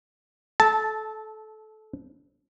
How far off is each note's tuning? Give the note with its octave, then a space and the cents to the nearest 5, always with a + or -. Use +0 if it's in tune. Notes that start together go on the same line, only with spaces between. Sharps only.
A4 -20 A5 +0